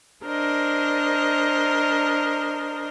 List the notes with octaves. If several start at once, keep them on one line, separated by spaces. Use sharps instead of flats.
D4 A#4 C5 D#5